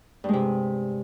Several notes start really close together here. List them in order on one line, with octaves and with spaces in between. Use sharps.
G2 G#3 C3